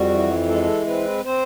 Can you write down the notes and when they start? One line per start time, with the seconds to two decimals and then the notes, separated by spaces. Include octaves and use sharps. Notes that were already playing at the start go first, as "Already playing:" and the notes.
Already playing: F2 G3 F#4
0.10 E3
0.48 G#3 A4
0.87 C4 B4
1.25 C4 C5